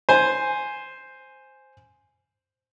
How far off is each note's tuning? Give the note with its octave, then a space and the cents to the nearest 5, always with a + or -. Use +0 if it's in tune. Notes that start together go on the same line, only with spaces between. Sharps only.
C5 +0 G#5 +0